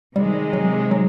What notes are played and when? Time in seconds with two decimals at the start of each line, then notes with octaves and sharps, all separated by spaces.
0.16 C3 D#3 G3 G#3
0.53 F#3
0.91 F#3